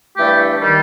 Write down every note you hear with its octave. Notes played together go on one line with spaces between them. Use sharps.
G2 E3 A3 G4
D#3 G3